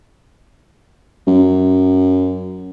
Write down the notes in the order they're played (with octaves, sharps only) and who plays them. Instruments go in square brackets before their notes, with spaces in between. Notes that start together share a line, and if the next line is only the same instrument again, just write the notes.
[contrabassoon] F#2